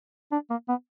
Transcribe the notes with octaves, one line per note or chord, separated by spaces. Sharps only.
D4
A#3
B3